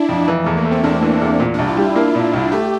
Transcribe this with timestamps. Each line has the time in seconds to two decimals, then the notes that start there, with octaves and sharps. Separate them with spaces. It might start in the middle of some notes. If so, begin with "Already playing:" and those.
Already playing: D4 E4
0.09 F2
0.28 E3
0.44 E2 A3
0.57 A#3
0.65 A3
0.71 C4
0.84 E2 D4
0.98 C4
1.02 E3
1.12 A#3
1.21 E2 C4
1.39 A#2 C4
1.54 D4
1.59 C2 E4
1.68 F4
1.77 G3 E4
1.96 A#3 E4
2.15 A#2
2.33 C2
2.52 A3 G4